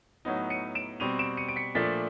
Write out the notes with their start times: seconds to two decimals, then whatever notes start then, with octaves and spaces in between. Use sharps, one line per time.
0.25 A2 F#3 B3 D#4
0.50 C#7 D#7
0.75 D7 E7
1.00 B2 G3 C4 D#7 F7
1.19 D7 E7
1.37 C#7 D#7
1.49 D7
1.56 B6 C#7
1.75 A#2 F3 A3 D4 A6 B6